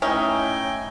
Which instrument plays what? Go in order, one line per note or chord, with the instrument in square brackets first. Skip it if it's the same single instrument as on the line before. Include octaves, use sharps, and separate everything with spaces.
[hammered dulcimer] A2 D#4 E5 [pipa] C#4 [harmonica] G5 G#5